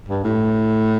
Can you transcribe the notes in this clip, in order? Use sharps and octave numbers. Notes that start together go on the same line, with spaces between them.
G2
A2